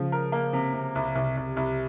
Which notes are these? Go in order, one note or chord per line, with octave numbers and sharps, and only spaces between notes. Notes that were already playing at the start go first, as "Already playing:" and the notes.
Already playing: C#3 F3
A#4
A#3
C3
C3
C2
C2 C3
C2
C2